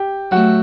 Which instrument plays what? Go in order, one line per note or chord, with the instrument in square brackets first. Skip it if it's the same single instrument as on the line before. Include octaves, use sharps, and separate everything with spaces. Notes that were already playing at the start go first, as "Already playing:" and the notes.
Already playing: [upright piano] G4
[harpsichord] F#3 A3 [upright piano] F#4